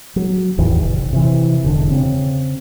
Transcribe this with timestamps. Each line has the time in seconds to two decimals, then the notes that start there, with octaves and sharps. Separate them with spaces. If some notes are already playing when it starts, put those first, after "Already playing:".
0.16 F#3
0.58 A1 E2 D#3
0.84 F1
1.13 C3 E3
1.64 E1 D3 D4
1.91 C#3 C4